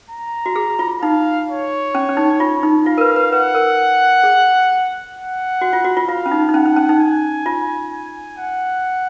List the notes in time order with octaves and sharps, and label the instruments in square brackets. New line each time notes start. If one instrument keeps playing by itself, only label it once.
[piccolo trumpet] A#5
[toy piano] F#4
G#4
F4
[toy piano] D#4 [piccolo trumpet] F5
[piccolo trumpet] C#5
[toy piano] C#4
C#4
D#4
F4
D#4
[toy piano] F4 [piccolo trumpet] F5
[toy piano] A#4
B4
B4
[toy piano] B4 [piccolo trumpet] F#5
[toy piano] A#4
G#4
[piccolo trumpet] F#5
[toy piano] F#4
F4
F#4
F4
[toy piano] F4 [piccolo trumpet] F5
[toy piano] C#4
D#4
D#4
[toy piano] C#4 [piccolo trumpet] F#5
[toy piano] D#4
C#4
D#4
[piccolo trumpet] G#5
[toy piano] F4
[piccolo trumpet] G#5
F#5